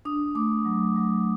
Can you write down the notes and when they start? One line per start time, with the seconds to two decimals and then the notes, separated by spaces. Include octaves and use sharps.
0.05 D4 D#6
0.35 A3 D6
0.65 F#3
0.96 F#3